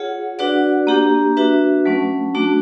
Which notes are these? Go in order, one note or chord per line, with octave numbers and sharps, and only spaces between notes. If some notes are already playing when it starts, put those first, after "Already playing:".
Already playing: F4 G#4 C#5 F#5
D4 F#4 B4 D5 F#5
A#3 D4 G4
D4 F#4 B4 E5
F#3 A3 C#4
A3 D4 F#4